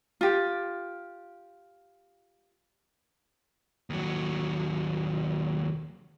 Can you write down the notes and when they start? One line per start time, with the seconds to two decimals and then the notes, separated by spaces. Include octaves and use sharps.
0.21 F4 G4
3.90 D#2 F#3